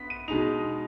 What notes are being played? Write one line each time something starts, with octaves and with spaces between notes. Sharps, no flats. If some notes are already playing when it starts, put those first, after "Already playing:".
Already playing: B3 B6
D#7
B2 G#3 D#4 F7